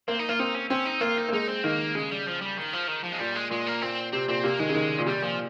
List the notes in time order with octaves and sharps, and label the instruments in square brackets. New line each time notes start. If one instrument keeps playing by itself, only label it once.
[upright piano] A#3 [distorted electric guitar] C4
[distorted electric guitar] D#4
[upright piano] A#3 [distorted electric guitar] F4
[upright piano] C4 [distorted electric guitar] D#4
[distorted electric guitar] C#4
[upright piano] C4 [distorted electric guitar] C#4
[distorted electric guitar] D#4
[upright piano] A#3 [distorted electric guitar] F4
[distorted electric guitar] D#4
[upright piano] A#3
[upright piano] G#3 [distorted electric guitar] D#4
[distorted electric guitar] C4
[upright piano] D#3 [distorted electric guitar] A#3
[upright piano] C#3 [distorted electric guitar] G#3
[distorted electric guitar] G3
F3
G3
D#3
F3
D#3
F3
G#3
[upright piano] A#2 [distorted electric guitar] G3
[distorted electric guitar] G#3
[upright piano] A#2 [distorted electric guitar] G#3
[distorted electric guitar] A#3
[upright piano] A#2 [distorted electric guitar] C4
[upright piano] C3 [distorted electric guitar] C4
[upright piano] A#2 [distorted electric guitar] C4
[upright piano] C3 [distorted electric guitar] A#3
[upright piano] D#3 [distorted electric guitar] G#3
[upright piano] C#3
D#3
A#2
[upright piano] C3 [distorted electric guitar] G3
[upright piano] A#2 [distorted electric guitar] F3